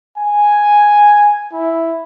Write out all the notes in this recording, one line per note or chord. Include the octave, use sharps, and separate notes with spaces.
G#5
E4